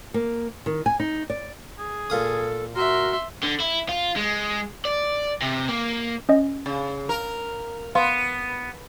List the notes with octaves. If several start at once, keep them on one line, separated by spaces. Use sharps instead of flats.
A#3
D#3
G#5
D#4
D5
G#4
A#2 A4 F5 D#6
F#4 A#4 E5 C6
D3
E4
F4
G#3
D5
C3
A#3
C#4 D#5
C#3
A#4
B3 F5 C6